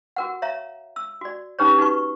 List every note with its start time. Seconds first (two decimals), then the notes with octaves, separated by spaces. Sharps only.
0.16 F#4 A#4 F#5
0.42 C#5 E5 F5 A#5
0.96 E6
1.21 F#4 D5
1.59 C#4 D#4 G4 B4 C#5
1.78 D#4 F#4 B4 C#6